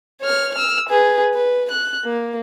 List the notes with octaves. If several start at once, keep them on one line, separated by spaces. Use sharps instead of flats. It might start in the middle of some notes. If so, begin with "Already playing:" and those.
C#5 F6
E6 F6
G#4 B4
B4
F#6
A#3